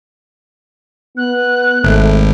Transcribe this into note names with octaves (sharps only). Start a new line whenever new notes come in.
B3 F#6
G#1 A3